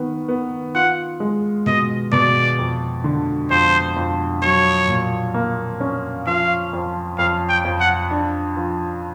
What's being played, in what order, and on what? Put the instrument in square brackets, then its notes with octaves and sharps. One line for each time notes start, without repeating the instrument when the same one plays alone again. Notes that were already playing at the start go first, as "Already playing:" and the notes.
Already playing: [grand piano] D#3 B3
B3
[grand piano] F4 [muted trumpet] F#5
[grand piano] G#3
[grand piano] B2 [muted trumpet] D#5
[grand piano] B2 [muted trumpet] D5
[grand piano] F2
D3
[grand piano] F2 [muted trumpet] C5
[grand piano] F2
[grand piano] F#3 [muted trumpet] C#5
[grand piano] A#2
A#3
C#4
[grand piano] F3 [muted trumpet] F5
[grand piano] F2
[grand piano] F2 [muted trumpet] F5
[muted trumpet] G5
[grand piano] F2
[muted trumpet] F#5
[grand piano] D4
F3